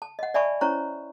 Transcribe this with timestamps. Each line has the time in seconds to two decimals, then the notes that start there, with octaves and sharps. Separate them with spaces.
0.02 A5
0.19 D#5 F#5
0.34 D5 E5 G#5 A5 B5 C#6
0.61 C#4 E4 C5 C#5 A#5 C#6